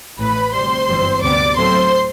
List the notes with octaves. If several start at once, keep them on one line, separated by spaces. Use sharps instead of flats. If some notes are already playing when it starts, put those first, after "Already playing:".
A1 A2 E3 B4 B5
D2 C3 G3 C5 C6
G1 F#2 E3 G3 C4
D2 C3 G3 B3 D5 D6
A2 F#3 A3 C4 C5 C6